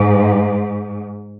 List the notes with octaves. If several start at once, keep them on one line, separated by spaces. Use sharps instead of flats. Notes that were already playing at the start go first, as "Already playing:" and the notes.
Already playing: G#2